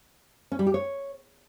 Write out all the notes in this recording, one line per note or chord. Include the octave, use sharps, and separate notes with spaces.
C#4
G3
G4
C#5